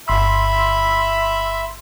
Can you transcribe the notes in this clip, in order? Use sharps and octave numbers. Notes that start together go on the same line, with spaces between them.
G1 E5 B5 C6 E6